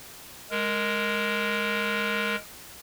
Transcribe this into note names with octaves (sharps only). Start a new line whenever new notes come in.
G#3 A#4